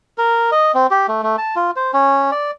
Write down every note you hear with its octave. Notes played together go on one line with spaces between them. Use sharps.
A#4
D#5
C4
G4
A3
A3
A5
F4
C5
C#4
D5